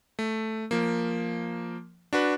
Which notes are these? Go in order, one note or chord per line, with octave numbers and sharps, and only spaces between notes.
A3
F3 A#3
D4 F#4 B4